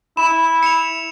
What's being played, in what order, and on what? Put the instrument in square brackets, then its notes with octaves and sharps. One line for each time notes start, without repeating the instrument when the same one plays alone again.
[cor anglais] E4 [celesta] B5 [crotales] E7
[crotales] C#7 F7